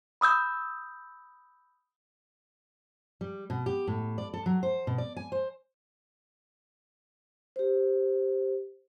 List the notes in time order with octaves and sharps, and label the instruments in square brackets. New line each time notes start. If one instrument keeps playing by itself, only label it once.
[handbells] B5 D#6 E6 G6
[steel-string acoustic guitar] G3
B2
G4
A2
D5
A4
F#3
C5
B2
D5
G#5
C5
[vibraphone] G4 C5